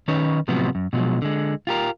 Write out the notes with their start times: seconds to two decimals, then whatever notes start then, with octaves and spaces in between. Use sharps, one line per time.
0.08 D#3 C#4 D#4 B4 C#5
0.48 A2 C3 F3 F#3 B3
0.75 F#2
0.93 B2 F3 F#3 G#3
1.22 D3 G#3
1.67 F4 G4 A#4